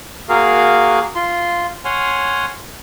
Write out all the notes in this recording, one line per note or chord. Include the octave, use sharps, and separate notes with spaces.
A#3 F#4 G#4 A#4 F5
F4 C6
C#5 F#5 G#5 C6 F6